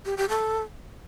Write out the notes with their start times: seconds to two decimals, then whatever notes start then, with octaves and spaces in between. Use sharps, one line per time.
0.05 G4
0.17 G4
0.29 A4